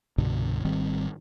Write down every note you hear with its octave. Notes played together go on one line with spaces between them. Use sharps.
C2 G2 B2 D3
G#1 D#3 G3 C4